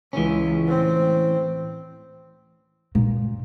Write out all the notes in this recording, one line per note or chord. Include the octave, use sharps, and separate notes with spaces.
C#2 E3 C#4
A2 C4
A#2